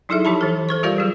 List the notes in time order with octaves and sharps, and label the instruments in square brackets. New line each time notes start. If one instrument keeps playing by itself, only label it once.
[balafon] F#3 D#4 E4 G#4 A4 E5
F3 D#4 G4 A5 B5
E3 A4
A4 C5 C#6
G3 F4 G4 A#4 D5 F5
F#3 G#4